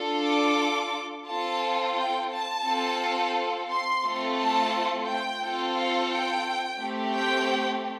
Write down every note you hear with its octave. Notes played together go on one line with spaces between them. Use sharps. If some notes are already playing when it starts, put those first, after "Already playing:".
Already playing: D4 F4 A4
D6
C4 F4 A4 A5
G5
A5
C4 F4 A4
C6
A3 C4 F4 A4
A5
G5
C4 F4 A4
F5
G5
A3 C4 G4
G5